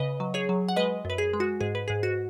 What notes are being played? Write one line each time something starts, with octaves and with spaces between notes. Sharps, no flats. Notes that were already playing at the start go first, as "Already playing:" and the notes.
Already playing: C#3 B4 D#5
F#3
G#4 C#5
F#3
F#5
G#3 B4 D#5
F#2 B4
G#4
G#3
F#4
G#2 G#4
B4
G#2 G#4
F#4